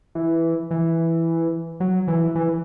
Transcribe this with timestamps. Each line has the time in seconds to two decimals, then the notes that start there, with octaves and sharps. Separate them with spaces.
0.15 E3
0.71 E3
1.80 F#3
2.08 E3
2.35 E3